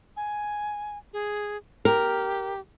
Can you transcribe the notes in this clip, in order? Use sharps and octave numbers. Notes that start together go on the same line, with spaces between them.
G#5
G#4
G4 A#4